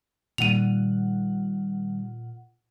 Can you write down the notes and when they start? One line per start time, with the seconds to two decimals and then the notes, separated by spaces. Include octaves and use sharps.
0.38 A#2 D#3 G3 F4 F#5 D#7 F7